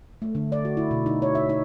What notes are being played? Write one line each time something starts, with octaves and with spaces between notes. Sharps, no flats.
A3
D3
D5
F#4
E4
B2
D#4
C#5
E5
D#4